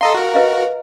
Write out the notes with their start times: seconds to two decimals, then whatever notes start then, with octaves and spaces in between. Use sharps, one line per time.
0.01 A4 D#5 F5 A#5 C6
0.14 F#4 A#4
0.34 B4 D#5 F5